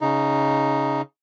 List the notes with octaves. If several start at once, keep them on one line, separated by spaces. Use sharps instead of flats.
C#3 D#4